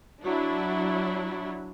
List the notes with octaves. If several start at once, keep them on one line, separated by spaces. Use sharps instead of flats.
F#3 D4 E4